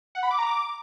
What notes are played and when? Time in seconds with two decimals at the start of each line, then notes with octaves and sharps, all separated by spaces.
0.15 F#5
0.23 B5
0.31 D6
0.38 A#5
0.46 D6